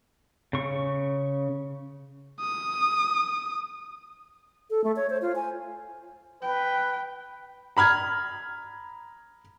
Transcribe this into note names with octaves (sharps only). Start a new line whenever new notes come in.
C#3 C#6
D#6
A4
A3
C#5
C5
F4
G#5
B4 G5
A#5 B5 F6 G#6